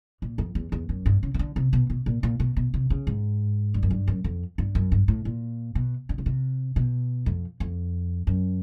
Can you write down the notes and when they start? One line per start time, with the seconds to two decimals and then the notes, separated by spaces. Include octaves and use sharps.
0.22 A#2
0.38 F2
0.55 E2
0.72 E2
0.89 F#2
1.06 G2
1.23 C#3
1.34 C#3
1.39 D3
1.56 C3
1.73 B2
1.90 B2
2.06 A#2
2.23 A#2
2.40 B2
2.57 B2
2.74 C3
2.90 C#3
3.07 G#2
3.74 G2
3.83 F#2
3.90 G2
4.08 F#2
4.24 F2
4.58 G2
4.75 F#2
4.92 G2
5.08 A2
5.25 A#2
5.75 B2
6.09 D3
6.18 C#3
6.26 C3
6.76 B2
7.26 F2
7.60 F2
8.27 F#2